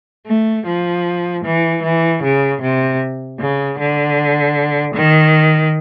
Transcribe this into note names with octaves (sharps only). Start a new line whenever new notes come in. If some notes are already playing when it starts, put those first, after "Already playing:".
A3
F3
E3
E3
C#3
C3
C#3
D3
D#3